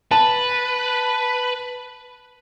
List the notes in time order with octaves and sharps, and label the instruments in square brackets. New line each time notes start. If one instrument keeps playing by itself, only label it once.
[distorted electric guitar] B4 [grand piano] A5